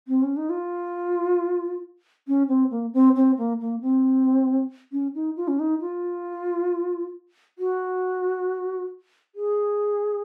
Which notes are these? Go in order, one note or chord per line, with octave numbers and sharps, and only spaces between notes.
C4
C#4
D#4
F4
C#4
C4
A#3
C4
C4
A#3
A#3
C4
C#4
D#4
F4
C#4
D#4
F4
F#4
G#4